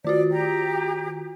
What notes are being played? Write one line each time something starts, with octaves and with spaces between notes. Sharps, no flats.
D#3 F4 F#4 D5
G4 A#5